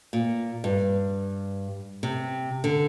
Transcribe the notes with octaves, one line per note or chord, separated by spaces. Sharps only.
A#2
G2
C3
D3